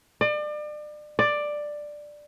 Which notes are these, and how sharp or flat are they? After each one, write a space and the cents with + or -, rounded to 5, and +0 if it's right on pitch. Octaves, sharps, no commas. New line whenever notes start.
D5 +35
D5 +10